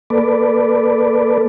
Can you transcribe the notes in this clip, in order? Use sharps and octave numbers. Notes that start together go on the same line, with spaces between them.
A#3 A4 B4 D5